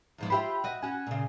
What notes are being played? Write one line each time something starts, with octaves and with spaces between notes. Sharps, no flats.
E2 G#2 F3
F4 G4 C5 E5 G5 B5
F#4 D#5
C#4 F#4 G#5
A#2 C#3